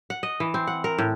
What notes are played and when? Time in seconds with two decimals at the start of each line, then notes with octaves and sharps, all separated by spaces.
0.10 F#5
0.23 D#5
0.40 E3
0.54 C4
0.67 F#5
0.84 A#4
0.98 A2